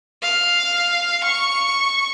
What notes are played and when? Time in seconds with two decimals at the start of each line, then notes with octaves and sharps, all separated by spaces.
0.23 F5
1.23 C#6